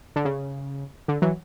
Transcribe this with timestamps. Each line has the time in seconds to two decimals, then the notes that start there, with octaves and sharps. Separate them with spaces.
0.16 D3
0.25 C#3
1.08 D3
1.22 E3 F#3